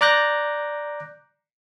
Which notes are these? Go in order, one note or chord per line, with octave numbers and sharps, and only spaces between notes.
D5 A#5 D6 F#6 G6 A#6